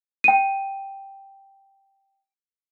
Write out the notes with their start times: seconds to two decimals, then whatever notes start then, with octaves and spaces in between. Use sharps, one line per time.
0.24 G5 D#7